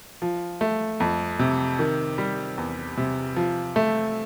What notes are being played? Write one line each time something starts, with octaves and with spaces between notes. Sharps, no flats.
F3
A3
F2
C3
D#3
G3
E2
C3
F3
A3